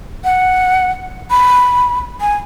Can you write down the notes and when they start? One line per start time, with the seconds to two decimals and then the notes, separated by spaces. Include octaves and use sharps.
0.24 F#5
1.30 B5
2.21 G#5